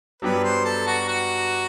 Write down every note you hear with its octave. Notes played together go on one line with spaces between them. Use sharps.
G2 F#3 B3 D4 G4 B4
C5
A4
F#4
F#4